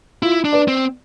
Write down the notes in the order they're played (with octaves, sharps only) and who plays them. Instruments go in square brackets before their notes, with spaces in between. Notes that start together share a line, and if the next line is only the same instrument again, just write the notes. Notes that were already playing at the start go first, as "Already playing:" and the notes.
[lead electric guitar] E4 [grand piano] F4
[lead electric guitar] D4
[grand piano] B4 D5
[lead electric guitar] C4